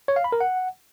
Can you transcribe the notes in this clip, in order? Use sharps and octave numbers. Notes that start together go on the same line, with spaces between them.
C#5
F5
B5
A#4
F#5